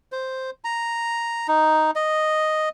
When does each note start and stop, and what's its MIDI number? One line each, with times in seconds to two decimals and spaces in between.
0.12 0.50 72
0.64 1.47 82
1.48 1.91 63
1.96 2.69 75